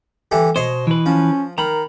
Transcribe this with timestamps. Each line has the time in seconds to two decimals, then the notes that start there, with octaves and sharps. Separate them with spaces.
0.31 D3 E3 G3
0.56 B2 C5 C#5 D#5 C6
0.87 E3 B4
1.06 F3 C#4
1.58 D#3 A#4 A#5 B5